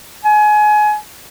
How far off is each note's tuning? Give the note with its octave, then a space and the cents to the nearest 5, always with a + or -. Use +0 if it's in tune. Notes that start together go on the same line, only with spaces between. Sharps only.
G#5 +25